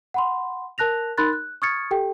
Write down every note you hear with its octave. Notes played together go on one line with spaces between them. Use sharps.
F#5 B5 C6
A#4 A5 F#6 A#6 F7
D#4 A#4 B5 C6 F#6 A6
F#6
C#6 D#6 F6 G#6 A6 C#7
G4 A4 G5